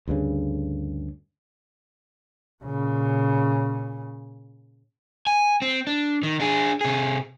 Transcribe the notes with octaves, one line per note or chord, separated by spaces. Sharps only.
D2 G2 C#3
A#2 C#3
G#5
C4
D4
D#3
D4 G#4
C3 G#4